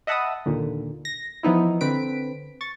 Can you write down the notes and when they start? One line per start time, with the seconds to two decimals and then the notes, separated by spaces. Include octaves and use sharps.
0.07 D#5 E5 F#5 A5 B5 D#6
0.46 D#2 A#2 D3
1.05 A#6
1.43 E3 F3 B3 D#4 E4
1.81 D3 C4 B4 B6 D7
2.61 C#6 A6